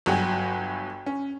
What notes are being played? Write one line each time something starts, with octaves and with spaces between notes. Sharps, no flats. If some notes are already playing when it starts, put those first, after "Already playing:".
G1 F#3 F#4 G5 G#5
C#4